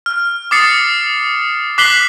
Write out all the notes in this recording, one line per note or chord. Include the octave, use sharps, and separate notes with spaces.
F6
D6 D#6 A6 C7 C#7
D6 F#6 B6 C7 F#7 G7